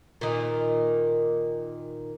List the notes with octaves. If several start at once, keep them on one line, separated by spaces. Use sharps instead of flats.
A#2 D#3